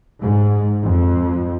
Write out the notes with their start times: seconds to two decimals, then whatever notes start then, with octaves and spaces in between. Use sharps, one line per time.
0.20 G#2
0.84 F2